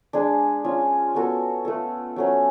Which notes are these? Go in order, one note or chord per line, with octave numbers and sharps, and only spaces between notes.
G#3 D4 G#4
C#4 F4 G#4
B3 F#4 A4
A3 F4 A4
F#3 A3 C#4